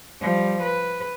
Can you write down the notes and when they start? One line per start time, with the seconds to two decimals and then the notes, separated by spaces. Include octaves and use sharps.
0.21 F3 G3
0.62 B4